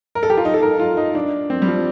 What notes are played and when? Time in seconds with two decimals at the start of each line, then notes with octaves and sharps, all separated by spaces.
0.15 A#4
0.23 A4
0.30 G4
0.38 F4
0.45 D#4
0.54 A4
0.62 A#4
0.80 F4
0.97 D#4
1.15 D4
1.50 C4
1.62 G3
1.68 F3